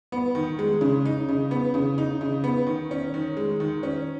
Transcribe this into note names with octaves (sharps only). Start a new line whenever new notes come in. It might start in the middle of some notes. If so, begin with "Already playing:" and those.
B3
D#3
G#3
C#3
D#4
C#3
B3
C#3
D#4
C#3
B3
D#3
C#4
D#3
G#3
D#3
C#4